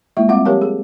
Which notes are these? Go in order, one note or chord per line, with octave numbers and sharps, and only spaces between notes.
G#3 A#3 E4 F4 E5
G3 C4 F4 F5 F#5 D6
F3 G4 A#4 C#5 F5 A5
G#4